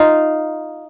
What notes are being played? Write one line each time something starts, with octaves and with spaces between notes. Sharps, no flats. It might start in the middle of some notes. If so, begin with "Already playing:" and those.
Already playing: D#4 F4